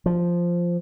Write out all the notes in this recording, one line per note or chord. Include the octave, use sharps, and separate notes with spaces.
F3